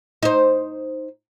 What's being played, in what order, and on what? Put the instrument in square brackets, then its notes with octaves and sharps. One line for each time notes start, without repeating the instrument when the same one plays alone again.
[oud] D#4 C5